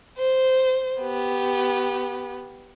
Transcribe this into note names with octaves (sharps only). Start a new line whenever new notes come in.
C5
B3 G4